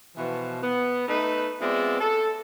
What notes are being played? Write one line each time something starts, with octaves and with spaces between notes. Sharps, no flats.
B2 E3 F3
B3
A3 D#4 B4
G#3 B3 C4 F4 D5 E5
A4